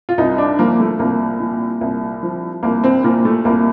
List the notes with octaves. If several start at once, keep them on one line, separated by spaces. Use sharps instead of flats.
F4
C2 D#4
D4
F3 A#3
A3
C2 A#3
A#2
C2
F3
C2 A#3
C4
A#2 A#3
A3
C2 A#3